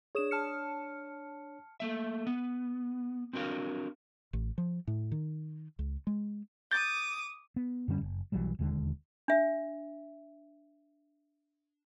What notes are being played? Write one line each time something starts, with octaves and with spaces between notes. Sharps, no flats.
D4 G#4 C#5 D#6 E7
A5 F6 C#7
A3 A#3 E5
B3
C4 D4 F#4 A#4 F5
A1
F3
A2
D#3
C#2
G#3
D6 D#6 G6 A6
B3
F#2 D3 G3 C#4
F#1
B1 E3 F#3 G3
E1 D#2 D3 G#3
D4 E5